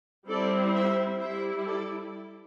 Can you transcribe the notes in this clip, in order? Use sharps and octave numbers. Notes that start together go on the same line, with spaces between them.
G3 C4 E4 A4 D5
C5 E5
G3 E4 C5 E5
A4 D5